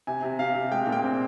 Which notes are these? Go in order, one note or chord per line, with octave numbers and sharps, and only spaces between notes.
C3 G#5
C3
C3 F5
C3
G#3 G5
A#2
G5
C4